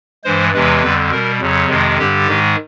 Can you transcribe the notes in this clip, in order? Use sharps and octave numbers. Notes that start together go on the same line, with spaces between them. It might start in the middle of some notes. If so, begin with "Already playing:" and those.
G2 E3 G#3 C5
E2 C3 E3 G#3 B4
F2 D3 G3
B2 G3 A#4
F2 C#3 F#3
F2 C3 D#3 G#3
G2 D3 G3 G4
G#2 D#3 G#3